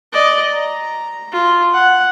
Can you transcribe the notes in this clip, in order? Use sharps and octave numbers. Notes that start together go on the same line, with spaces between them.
D5 D#5
A#5
F4
F#5